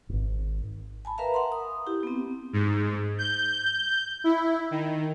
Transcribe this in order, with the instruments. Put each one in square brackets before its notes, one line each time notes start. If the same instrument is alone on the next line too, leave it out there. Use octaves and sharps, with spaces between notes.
[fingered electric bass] D1 G#1
[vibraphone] G#5 A5 B5
A#4 B4 E5 F5 A#5
F#5 A#5 C6
D#6
E4 G4
B3 C4
[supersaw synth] G#2
G6
E4
D#3